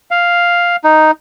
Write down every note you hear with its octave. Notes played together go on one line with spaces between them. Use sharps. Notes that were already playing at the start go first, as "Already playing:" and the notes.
F5
D#4